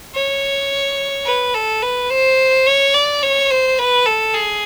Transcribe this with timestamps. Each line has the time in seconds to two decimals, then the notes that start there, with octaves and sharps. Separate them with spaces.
0.14 C#5
1.26 B4
1.54 A4
1.82 B4
2.10 C5
2.66 C#5
2.94 D5
3.23 C#5
3.50 C5
3.78 B4
4.06 A4
4.34 G#4